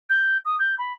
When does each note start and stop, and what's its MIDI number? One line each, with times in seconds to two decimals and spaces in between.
0.09 0.37 91
0.45 0.55 87
0.59 0.75 91
0.78 0.93 83